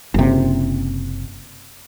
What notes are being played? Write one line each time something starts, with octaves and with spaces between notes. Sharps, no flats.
F#1 C3